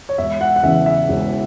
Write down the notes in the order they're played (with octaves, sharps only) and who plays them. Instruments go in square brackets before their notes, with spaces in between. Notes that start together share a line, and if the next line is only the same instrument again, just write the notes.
[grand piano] C#5
E1 E5
F#5
F#5
E2 C#3 E5
E5
E1